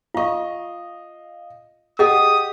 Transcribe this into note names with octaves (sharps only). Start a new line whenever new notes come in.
F4 D#5 F5 C#6
G4 G#4 D#5 F#5 D#6